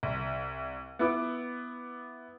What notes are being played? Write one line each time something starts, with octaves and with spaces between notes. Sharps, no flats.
C2
B3 E4 B4 D6 E6